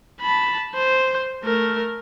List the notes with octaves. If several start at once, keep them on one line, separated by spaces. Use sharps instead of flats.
A5 B5
C5
A3 A#4